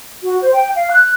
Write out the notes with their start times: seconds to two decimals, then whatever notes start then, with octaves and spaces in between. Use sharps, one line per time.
0.23 F#4
0.41 C5
0.54 G5
0.75 F5
0.90 F#6